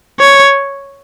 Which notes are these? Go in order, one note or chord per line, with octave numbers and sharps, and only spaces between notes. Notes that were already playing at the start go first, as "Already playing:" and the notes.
C#5